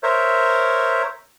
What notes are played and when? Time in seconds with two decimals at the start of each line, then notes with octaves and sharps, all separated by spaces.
0.03 A#4 C5 C#5 E5